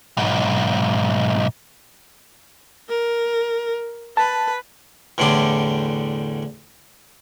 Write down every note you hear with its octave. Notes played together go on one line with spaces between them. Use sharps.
B1 G#2
A#4
B4 A5
E2 A2 D3 G3 C6 D6